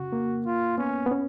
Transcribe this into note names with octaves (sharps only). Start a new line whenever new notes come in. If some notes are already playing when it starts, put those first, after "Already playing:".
Already playing: C#3 F#4
A#3
F4
B3 C#4
B3
C#4